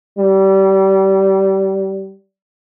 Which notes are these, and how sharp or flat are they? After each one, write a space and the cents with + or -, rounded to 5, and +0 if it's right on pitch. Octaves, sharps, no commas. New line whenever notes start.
G3 -25